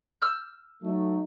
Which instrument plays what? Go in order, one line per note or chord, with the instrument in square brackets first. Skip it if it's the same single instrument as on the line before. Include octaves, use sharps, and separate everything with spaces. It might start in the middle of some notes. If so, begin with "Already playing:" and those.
[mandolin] E6 F6 G6
[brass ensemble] F#3 A3 D#4